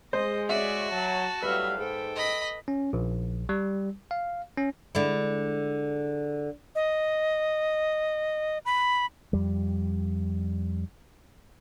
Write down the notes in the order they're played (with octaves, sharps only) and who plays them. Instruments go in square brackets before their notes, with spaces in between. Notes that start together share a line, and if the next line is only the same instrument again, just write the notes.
[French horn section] G#3 [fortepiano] C5 [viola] D#5
[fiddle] F#4 [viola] C#5 D5 [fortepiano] E5
[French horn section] F#3 [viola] A5
[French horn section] A2 F#3 G3 [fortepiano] B4 [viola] E5 F5
[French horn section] G#2 [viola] A4 G5
[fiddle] D#5 B5
[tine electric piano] C#4
A#1
G3
F5
C#4
[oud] D3 G#3 E4
[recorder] D#5
B5
[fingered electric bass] F2 G3